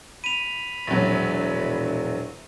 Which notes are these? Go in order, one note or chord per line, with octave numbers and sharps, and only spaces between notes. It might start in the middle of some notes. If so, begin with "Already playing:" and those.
B5 D#7 F7
E1 A#1 F#3